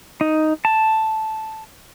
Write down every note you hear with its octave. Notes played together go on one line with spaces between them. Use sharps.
D#4
A5